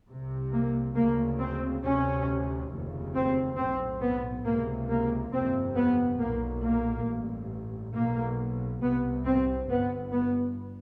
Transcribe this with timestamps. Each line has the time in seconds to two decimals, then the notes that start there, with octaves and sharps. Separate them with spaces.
0.09 C2 C3
0.52 A#3
0.95 D2 C#3 A#3
1.39 C4
1.83 D2 C3 C#4
2.71 F1 D#2 C#3
3.15 C4
3.58 B1 A2 C4
4.02 B3
4.45 C#2 C3 A#3
4.89 A#3
5.33 G1 F2 C3 C4
5.76 B3
6.19 B1 A#2 A#3
6.63 A#3
7.08 A1 G2
7.94 B1 B2 A#3
8.81 C2 C3 B3
9.25 C4
9.68 G1 G2 B3
10.13 B3